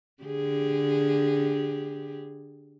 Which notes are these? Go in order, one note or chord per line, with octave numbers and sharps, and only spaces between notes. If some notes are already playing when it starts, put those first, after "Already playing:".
D3 G4 G#4